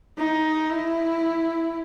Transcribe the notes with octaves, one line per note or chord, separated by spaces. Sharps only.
D#4
E4